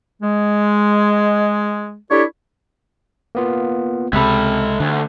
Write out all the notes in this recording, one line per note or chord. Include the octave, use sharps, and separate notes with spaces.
G#3
D4 E4 G4 A4 C#5
A#3 B3 F4
C#2 C3 G#3 A4 E5 B5
D2 D3